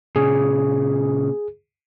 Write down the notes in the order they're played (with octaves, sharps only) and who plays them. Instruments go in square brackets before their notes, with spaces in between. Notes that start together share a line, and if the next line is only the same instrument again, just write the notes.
[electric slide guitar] A#2 C#3 [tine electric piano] G#4